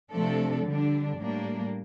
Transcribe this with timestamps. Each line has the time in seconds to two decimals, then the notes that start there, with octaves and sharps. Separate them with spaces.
0.12 C3 F3 A3 D4 A4
0.65 D3 G3 D4
1.19 A2 G3 A#3 D4